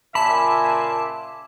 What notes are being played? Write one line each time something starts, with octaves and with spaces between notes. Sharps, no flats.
A#2 C#3 E5 G#5 A5 B5 C6 D6